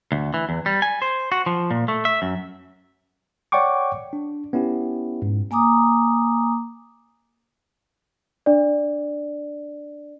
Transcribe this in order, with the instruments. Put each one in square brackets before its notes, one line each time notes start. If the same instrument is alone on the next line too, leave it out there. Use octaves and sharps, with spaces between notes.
[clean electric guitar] D2
E3
E2
G3
G#5
C5
F#4
F3
A#2
A3
E5
F#2
[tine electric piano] C#5 D5 F#5 G5 C#6 D6
D4
B3 C#4 E4 G4
G#2
[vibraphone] A#3 G#5 A#5 D6 D#6
[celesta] D4 D5